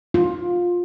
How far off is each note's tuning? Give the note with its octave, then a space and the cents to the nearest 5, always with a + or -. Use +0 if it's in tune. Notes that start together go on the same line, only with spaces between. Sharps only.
F4 +15